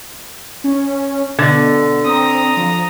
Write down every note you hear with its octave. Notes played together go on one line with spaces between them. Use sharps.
C#4
B2 D3
C4 A#5 D#6
F3